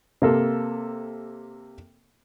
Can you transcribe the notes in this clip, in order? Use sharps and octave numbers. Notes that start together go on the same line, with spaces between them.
C3 A#3 A4